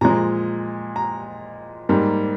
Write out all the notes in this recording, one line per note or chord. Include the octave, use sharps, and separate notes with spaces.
A#2 F3 G#3 A#5
A#5
G#2 G3 A#3